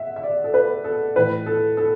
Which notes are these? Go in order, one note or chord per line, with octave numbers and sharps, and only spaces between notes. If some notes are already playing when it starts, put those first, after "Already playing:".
Already playing: E5 F#5
E5
D5
A4
B4
A4
A2 E3 B4
A4
A4